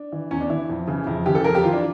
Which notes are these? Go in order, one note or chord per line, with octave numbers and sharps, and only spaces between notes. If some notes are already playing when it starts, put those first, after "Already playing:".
Already playing: D4
E3
E2 C#4
D4
E3 E4
F2
C#3 E3
F2 E4
C#3 E3 G4
A4
F2 A#4
G4
E3 F4
D4